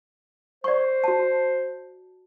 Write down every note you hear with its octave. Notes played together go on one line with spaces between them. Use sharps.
C5 D5 C#6
F#4 A5